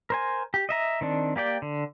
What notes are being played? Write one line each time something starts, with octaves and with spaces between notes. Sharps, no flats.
A#4 C5 G#5
G4
D#5 E5 A#5
D#3 C4 D4
A#3 G4 D5 G5
D3